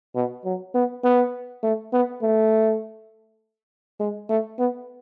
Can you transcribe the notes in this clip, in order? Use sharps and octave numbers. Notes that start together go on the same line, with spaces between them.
B2
F#3
B3
B3
A3
B3
A3
G#3
A3
B3